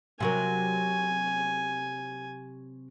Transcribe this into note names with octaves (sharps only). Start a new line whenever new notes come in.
C3 F#3 A#4 G#5